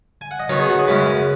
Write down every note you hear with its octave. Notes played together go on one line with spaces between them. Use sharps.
G#5
F#5
D#5
D#3 F#3 B3 D#4 C#5
G#4
F#4
G#4
F#2 C#3 G#3 C#4 B4